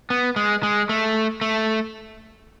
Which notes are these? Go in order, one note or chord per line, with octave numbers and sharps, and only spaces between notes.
B3
G#3
G#3
A3
A3